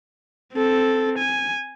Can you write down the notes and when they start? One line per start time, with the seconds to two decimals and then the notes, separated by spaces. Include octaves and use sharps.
0.54 C4 A4
1.18 G#5